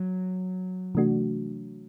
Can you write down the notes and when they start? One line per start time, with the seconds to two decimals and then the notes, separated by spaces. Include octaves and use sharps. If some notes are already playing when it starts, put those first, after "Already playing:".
Already playing: F#3
0.95 C3 E3 A3 D4 F#4